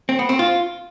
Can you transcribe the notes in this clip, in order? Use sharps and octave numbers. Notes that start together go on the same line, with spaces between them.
C4
B3
C4
F4